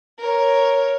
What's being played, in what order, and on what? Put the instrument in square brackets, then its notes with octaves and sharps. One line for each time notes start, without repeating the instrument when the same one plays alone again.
[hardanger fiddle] A#4 C#5